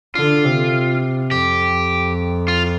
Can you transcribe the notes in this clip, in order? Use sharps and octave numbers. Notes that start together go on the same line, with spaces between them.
D3 F4
C3
F2 G4
F4